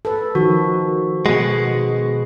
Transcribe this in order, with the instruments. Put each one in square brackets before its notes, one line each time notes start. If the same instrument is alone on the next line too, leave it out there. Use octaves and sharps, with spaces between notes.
[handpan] A4 B4
[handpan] D#3 F3 [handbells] F#4
[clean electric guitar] B2 G#3 [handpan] F#5